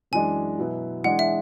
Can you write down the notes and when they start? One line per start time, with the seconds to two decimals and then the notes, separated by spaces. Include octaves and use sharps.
0.12 F#2 E3 G#3 D4 G#5
0.58 B2 F#3 B3 E4
1.04 E3 G#3 D4 G#4 F#5
1.19 E5